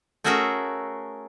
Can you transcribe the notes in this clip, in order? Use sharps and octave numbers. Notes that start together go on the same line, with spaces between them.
A3 C#4 F#4 G#4 A#4 E5